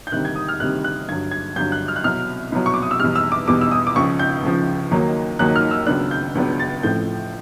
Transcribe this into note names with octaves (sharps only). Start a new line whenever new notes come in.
G6
D2 C3 D#3 G3 C4 F#6
G#6
D#6
F6
D2 C3 D#3 G3 C4 F#6
F#6
G2 D3 F#3 G#6
G#6
G2 D3 F#3 G6
F#6
F6
F#6
C2 B2 F#3 F6
C2 B2 F#3
C#6
D6
D#6
E6
E2 B2 G3 F6
E6
D6
E2 B2 G3 D6
E6
D#6
D6
C#2 C#3 F3 C#6
G6
C#2 C#3 F3
D#2 D#3 F#3 A#3 D#4
D#2 D#3 F#3 A#3 D#4 F#6
F6
E6
C#2 C#3 F#3 B3 D4 F#6
G6
C#2 C#3 F#3 B3 D4
A6
A1 A2 F3 A3 C4 G6